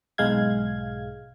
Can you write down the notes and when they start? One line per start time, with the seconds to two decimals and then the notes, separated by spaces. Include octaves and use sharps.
0.18 B1 G#2 G#3 F5 G#6